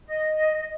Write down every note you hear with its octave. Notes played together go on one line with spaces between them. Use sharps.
D#5